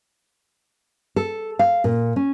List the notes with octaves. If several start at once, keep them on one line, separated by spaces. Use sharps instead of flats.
A4
F5
A#2
C#4